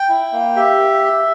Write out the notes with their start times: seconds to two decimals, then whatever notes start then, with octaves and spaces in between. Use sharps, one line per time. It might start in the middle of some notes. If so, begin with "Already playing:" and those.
Already playing: G5
0.09 E4
0.32 A#3
0.56 G4 E5